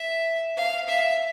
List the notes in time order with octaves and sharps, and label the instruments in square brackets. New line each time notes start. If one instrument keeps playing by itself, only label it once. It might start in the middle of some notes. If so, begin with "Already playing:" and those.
Already playing: [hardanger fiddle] E5
F5
E5